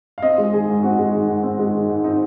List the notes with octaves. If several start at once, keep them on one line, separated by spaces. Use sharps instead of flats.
F5
C4 D#5
G#3
D#3 G#4
G#2
C4 F#4
G#3
D#3
G#2
C4
G#3
D#3
G#2
C4 D#4